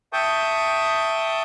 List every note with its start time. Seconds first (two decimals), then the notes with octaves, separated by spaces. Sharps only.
0.13 E5 G5 A5 C#6 D#6 G6